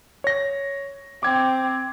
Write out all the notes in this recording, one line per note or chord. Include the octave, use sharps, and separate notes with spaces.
C#5 A#6
C4 D6 G#6